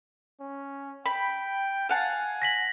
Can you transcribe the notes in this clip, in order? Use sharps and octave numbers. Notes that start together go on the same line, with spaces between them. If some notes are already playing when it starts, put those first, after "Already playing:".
C#4
G5 B5
F5 F#5 G#5 A5
A#6 B6 F#7